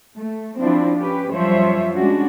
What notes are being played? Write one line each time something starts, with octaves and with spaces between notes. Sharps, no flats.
A3
F3 C4 D4 E4
C#4 G4 B4
F#2 F3 G3 C5 C#5 E5
G3 G#3 C#4 D4 F#4